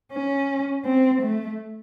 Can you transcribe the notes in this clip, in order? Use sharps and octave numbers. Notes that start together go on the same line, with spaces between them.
C#4
C4
A3